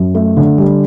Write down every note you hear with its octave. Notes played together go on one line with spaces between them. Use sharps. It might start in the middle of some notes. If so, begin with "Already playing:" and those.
Already playing: F#2
A3
D3
G3